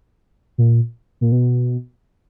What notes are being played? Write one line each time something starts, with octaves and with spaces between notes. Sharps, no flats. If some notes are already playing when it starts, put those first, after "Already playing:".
A#2
A#2
B2